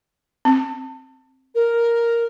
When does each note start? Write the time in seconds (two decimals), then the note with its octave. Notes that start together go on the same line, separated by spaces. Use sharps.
0.45 C4
1.55 A#4